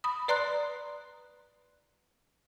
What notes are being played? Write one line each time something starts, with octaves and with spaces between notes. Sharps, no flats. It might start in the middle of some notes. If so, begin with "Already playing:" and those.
B5 D#6
B4 D5 A#5 C6 F#6